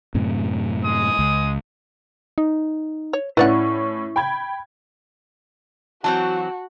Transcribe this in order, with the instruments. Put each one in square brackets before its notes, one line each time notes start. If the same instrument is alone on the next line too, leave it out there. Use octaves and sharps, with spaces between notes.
[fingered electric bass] F#2 A2 C3
[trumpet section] G#3 D#6
[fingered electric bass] C#2
[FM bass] D#4
[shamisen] C#5
[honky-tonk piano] A2 C#4 [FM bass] E4 [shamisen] B4 D5 F#5
[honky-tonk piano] G5 B5 G#6
[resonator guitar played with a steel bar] E3 F#3 C4 [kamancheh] F#4 [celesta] A5